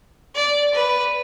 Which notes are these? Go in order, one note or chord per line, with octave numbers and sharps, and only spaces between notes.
D5
B4